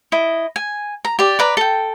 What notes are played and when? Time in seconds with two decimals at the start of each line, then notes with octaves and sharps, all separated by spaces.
0.12 E4 D#5
0.56 G#5
1.05 A#5
1.19 G4 D5
1.39 B4 D5 A#5
1.57 A4 G5